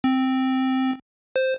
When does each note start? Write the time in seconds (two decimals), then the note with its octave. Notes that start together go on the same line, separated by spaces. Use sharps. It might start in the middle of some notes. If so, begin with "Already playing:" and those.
0.04 C4
1.36 C5